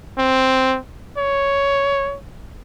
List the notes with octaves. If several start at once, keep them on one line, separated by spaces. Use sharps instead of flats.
C4
C#5